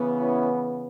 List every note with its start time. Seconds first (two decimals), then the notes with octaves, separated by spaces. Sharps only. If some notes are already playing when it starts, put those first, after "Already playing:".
Already playing: C#3 E3 B3
0.21 C#4 E4